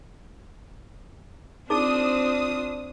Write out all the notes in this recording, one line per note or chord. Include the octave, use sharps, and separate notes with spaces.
C4 D4 D#4 F4 G#4 C5 D6 D#6